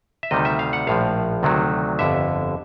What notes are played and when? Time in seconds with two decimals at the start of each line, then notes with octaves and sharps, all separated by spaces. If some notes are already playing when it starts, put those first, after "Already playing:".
0.23 E5
0.31 D2 C3 D#3 G3 D#5
0.45 E5
0.59 F5
0.73 F#5
0.87 A#1 A2 F3 F5
1.43 D2 C3 D#3 F#3
1.99 G1 F2 D3 E5